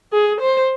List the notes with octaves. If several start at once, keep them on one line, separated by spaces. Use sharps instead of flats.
G#4
C5